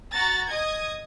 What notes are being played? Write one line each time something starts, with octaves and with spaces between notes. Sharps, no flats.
F#4 A#5 A6
D#5 D#6 G#6